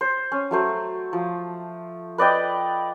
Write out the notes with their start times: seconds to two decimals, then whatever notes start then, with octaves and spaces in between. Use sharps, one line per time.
0.01 C5
0.32 C#4
0.51 F#3 A3 C5
1.13 F3
2.18 B4 D5 D#5 G5